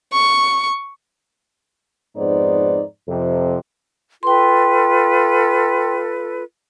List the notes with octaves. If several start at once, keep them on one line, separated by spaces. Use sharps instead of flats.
C#6
F2 G#2 B3 D#4 C5 D5
F2 C3
F4 A4 B4 G5 C6